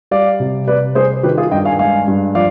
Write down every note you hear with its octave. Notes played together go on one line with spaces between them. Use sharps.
G3 D5 F5
C3
C3 B4 D5
G3 G#4 C5
D#3 G4 B4
F4 G#4
G2 D#5 G5
F5 G#5
G#3 F5 G#5
G2
F3 D5 F5